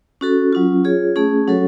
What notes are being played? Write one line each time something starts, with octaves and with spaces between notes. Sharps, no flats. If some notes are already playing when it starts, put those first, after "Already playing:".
C#4 F#4 A4
F#3 C#4 F4
F4 G#4 C#5
A3 C#4 G#4
F#3 C#4 F#4 A4 C#5